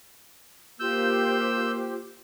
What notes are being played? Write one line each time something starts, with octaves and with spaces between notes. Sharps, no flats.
A#3 F4 G4 C5 E6 G6